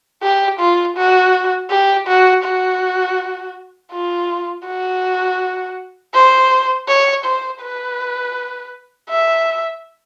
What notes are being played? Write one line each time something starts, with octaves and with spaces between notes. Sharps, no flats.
G4
F4
F#4
G4
F#4
F#4
F4
F#4
C5
C#5
C5
B4
E5